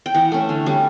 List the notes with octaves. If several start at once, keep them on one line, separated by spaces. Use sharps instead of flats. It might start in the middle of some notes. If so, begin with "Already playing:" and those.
G5
E3 F#5
A3 C#4
D3
G3 C#4